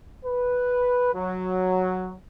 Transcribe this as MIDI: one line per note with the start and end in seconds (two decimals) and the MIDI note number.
0.24 1.11 71
1.14 2.14 54